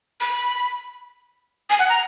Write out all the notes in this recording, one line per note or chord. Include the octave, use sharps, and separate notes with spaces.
B5
G#5
F#5
A#5